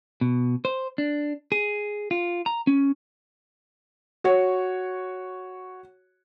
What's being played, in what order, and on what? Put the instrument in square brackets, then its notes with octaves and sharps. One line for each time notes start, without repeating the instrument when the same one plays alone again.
[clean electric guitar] B2
C5
D4
G#4
F4
A#5
C#4
[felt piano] F#4 C#5